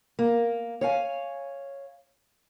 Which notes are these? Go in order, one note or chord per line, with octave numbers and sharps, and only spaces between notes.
A#3
C#5 F5 G#5